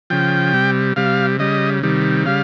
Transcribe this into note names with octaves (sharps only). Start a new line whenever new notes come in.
C#3 F3 G5
C3 G3
C3 G3 F5
C#3 G3 D#5
C3 D#3 G3
C#3 G3 F5